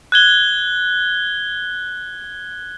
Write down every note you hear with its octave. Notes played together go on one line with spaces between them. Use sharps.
F#6 G#6 G7